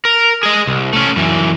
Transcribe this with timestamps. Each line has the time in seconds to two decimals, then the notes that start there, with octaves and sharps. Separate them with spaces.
0.05 A#4
0.43 G#4 D#5
0.67 C2
0.93 A3 C#4
1.16 F#2 E3